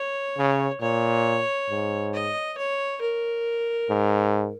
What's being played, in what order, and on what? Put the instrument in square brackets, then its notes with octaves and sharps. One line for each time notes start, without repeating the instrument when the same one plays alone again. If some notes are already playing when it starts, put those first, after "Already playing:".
Already playing: [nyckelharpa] C#5
[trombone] C#3
[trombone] A#2 [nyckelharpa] C#5
[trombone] G#2
[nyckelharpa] D#5
C#5
A#4
[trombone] G#2